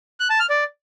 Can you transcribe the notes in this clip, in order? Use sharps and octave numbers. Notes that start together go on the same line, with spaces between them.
F#6
A5
F6
D5